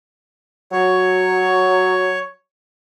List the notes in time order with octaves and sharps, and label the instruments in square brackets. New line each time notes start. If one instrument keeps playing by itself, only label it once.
[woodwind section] F#3 [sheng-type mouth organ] C#5